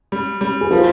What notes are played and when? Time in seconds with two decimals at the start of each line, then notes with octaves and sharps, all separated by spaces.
0.12 G3
0.41 G3
0.61 G#4
0.71 F3 A#4